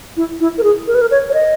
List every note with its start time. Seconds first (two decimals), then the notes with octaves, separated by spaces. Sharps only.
0.17 E4
0.40 E4
0.58 A#4
0.63 G#4
0.87 A#4
0.95 B4
1.01 A#4
1.11 C#5
1.30 C#5
1.34 D#5